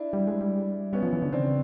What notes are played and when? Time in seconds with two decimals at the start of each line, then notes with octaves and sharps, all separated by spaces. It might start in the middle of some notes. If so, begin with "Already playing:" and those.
Already playing: D4 E4
0.13 G3
0.27 G#3
0.41 G3
0.93 G3 B3 C#4
1.03 F3
1.13 E3
1.22 D3
1.33 C#3 C4 D4